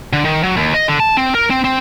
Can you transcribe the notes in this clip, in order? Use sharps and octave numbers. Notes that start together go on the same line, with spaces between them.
D3
D#3
F#3
D#2
D#5
D3
A5
C4
A#4
C4
C4